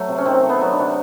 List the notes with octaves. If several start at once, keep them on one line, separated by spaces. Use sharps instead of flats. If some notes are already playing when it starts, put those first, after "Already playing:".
Already playing: F#3 A3
C3
C#4
D#3 C4
A3
B3
F#3
D4
C3